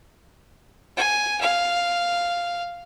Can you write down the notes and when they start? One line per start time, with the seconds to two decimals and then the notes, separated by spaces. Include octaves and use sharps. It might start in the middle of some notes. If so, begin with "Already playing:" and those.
0.96 G#5
1.41 F5